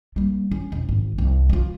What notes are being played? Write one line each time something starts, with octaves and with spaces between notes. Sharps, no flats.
G3 A#3
C#4
E1
G#1
C2
B3 F4